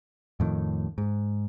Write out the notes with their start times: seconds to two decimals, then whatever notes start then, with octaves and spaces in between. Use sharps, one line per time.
0.40 F2 A2 D#3
0.98 G#2